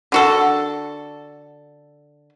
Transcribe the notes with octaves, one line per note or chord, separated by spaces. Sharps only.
D3 F#4 A4